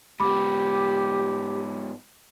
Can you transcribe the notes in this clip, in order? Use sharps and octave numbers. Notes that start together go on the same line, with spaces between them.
G#2 B3 G4 B5 D6